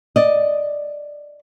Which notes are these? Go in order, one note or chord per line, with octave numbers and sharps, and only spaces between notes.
D5 D#5